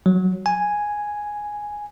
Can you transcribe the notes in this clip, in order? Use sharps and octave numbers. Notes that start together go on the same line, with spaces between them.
F#3
G#5